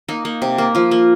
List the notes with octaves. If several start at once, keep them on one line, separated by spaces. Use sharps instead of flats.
A#3 D#4
A#3
C3
A#3
F3 F4
A#3